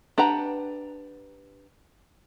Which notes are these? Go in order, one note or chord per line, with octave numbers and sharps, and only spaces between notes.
D4 G4 B4 F#5 A#5